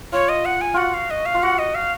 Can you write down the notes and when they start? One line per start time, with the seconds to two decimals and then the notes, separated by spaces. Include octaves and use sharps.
0.12 F4 C#5
0.29 D#5
0.45 F#5
0.61 G#5
0.74 F4 F#4 F#5
0.94 F5
1.11 D#5
1.26 F5
1.34 F4
1.43 F#4 F#5
1.59 D#5
1.75 F5